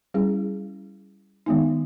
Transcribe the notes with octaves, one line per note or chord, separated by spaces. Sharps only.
G3 C#4 E4 G#4
D#3 G#3 B3 D#4